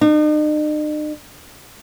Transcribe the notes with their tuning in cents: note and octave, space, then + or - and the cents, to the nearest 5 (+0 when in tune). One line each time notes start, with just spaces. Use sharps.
D#4 -45